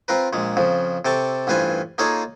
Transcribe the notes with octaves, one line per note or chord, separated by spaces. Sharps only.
C4 F4 A#4 B4
A#1 A#2 G#3
F2 C#3 F3
C3 A4 G5 A5 C#6
A1 G2 F4 B4 C5 G#5
A#3 D#4 F4 G#4 A4 C#5